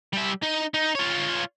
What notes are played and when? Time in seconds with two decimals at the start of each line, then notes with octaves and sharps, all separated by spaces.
0.13 G3 E5
0.42 D#4
0.74 D#4
0.95 F4 C#5